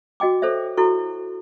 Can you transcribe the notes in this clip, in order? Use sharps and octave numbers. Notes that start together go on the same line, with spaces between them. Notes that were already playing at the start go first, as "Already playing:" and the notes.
F#4 D#5 G5 D6
A4 C5 C#5 E5
E4 F#4 A4 C#6